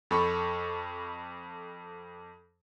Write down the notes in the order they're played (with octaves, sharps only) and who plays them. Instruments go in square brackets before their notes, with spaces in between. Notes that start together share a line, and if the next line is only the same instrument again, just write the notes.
[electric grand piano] F2 A4 B5 C#6